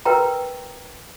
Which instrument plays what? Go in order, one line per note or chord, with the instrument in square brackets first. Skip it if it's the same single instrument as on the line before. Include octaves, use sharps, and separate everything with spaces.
[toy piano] A#4 B4 G5 A#5